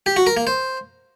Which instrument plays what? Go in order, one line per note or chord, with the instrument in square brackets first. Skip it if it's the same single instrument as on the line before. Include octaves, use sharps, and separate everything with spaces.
[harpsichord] G4
F#4
A#4
A#3
C5